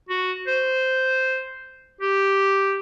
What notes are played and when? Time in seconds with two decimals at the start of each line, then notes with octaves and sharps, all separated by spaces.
0.09 F#4
0.47 C5
2.01 G4